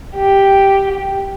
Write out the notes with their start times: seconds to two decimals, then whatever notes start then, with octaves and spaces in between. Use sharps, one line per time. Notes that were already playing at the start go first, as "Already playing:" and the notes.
0.16 G4